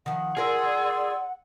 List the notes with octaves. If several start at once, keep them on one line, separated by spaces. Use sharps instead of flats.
D#3 F3 F#5
F4 G#4 A#4 D5 C6 E6